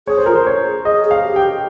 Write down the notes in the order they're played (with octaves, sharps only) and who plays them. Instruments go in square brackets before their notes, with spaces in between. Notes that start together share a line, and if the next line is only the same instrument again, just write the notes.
[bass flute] G#4 [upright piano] C#5
[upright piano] C5
[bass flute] F4 [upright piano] A#4
[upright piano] C5
C#5
[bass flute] G#4
[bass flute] G#4 [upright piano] D#5
[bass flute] G#4
[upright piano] F5
[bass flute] G4
[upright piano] G5
[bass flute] G#4